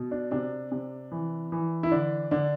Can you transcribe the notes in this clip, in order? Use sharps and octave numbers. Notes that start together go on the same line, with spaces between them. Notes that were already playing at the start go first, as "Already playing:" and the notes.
Already playing: B2
D4
C3 D4
C3
E3
E3
E4
D3 D4
D3 D4